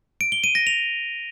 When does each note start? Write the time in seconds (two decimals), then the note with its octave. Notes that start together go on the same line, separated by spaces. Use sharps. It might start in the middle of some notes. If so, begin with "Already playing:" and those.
0.21 D7
0.32 G7
0.44 D#7
0.55 A#6
0.67 F7